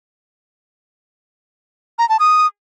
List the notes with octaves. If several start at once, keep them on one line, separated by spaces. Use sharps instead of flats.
A#5
A5
D#6